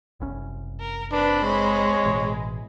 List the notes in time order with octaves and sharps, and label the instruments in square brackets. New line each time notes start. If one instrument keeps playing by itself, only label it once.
[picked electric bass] F#1 C2 C#4
[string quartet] A#4
[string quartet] C4 B5 [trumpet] D4 [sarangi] B4
[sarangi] G#3 [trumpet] C#5
[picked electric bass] A1 B2 E3